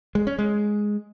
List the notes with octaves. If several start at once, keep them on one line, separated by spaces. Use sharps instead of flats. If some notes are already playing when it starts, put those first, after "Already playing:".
G#3
C#4
G#3